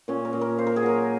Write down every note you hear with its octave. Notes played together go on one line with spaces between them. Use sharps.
A#2 C#4
A#4
A#2
A#4
A#3 C5
A#4
G#4
F#3 A#4